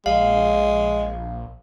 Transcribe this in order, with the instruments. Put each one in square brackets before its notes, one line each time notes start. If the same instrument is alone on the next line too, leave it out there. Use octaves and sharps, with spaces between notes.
[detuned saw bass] A#1 [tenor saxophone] G#3 [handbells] F5